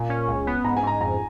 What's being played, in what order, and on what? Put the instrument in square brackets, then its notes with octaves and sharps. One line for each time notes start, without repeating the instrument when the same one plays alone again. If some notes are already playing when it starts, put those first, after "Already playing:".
Already playing: [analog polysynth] A#2 [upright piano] G#5
[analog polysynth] C#4
C#2
B3
[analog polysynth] G#2 [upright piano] A#5
[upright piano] G#5
[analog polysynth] G#2 [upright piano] A#5
[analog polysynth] F2 [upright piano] A#5